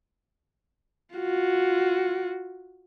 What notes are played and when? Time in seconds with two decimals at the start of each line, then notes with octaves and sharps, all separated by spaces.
1.16 F4 F#4